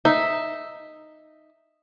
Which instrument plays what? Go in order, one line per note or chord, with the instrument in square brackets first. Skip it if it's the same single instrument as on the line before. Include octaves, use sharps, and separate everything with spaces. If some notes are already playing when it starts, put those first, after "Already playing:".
[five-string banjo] D#4 [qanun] E5